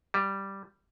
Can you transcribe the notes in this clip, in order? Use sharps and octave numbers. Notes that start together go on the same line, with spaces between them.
G3